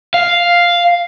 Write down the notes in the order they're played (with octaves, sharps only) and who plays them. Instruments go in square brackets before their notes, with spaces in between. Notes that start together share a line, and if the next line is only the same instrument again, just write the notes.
[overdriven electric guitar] F5